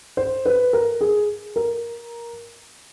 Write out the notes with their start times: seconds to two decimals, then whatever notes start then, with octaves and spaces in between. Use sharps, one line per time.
0.17 C5
0.46 B4
0.73 A#4
1.01 G#4
1.56 A#4